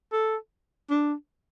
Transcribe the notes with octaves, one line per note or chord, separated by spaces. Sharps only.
A4
D4